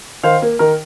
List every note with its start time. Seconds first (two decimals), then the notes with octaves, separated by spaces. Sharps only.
0.23 D#3 C5 F5
0.42 A#3
0.59 D#3 A#4